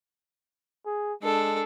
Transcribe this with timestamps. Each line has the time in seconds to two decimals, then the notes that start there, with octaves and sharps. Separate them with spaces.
0.86 G#4
1.23 G#3 D4 A4